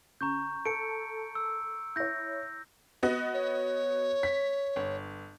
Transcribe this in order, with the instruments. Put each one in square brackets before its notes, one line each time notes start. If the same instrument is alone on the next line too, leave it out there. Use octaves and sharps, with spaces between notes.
[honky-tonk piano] C#3 [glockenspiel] A#5 C#6 G6
[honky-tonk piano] A4 [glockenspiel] C#7 D7
[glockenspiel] E6
[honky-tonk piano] E4 C#5 [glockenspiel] G6 A#6
[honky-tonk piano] B3 F#4 D#5
[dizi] C#5
[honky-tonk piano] B6
G1